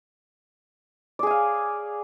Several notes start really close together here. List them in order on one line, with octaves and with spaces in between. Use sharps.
D5 G#4 G#5 F5